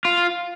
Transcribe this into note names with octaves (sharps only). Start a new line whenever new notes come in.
F4